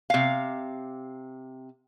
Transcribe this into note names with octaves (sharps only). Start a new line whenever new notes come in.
C3 F5